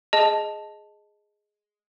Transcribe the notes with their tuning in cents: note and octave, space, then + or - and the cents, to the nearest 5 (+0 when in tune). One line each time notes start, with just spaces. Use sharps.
G#4 +5 D#5 +0 A5 +0